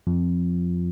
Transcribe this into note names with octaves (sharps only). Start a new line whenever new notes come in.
F2